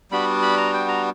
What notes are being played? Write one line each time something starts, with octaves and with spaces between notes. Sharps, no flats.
G3 B3 D4 F#4 B5
B5
A#5
G5
A#5